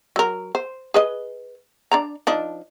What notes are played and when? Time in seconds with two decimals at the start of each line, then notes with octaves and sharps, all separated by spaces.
0.16 F#3 A#4
0.55 C5
0.94 G#4 B4 D#5
1.92 D4 D5 A#5
2.27 F3 D4 D#4